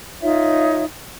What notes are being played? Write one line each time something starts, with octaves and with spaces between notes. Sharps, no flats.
D#4 F4 C#5 E5